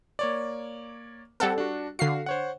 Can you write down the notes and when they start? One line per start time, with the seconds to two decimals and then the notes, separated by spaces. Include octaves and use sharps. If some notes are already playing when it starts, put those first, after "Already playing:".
0.19 A#3 C#5 D5
1.40 G3 C4 A4 F#5
1.58 D4 F#4
1.99 D3 F#4 F5 C7
2.26 C5 C#5 F#5